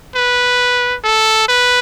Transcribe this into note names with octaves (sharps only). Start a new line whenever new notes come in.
B4
A4
B4